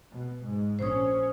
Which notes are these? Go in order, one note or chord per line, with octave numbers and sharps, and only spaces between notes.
B2
G#2
A#1 C#4 C5 D#6